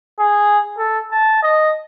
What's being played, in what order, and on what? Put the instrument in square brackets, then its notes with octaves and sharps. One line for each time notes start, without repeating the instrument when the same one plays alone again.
[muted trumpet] G#4
A4
A5
D#5